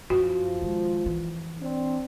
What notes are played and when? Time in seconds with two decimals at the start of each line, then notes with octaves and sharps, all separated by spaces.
0.10 F#2 F3 F#4
0.61 D#3 G#3
1.06 E3
1.60 C4 D4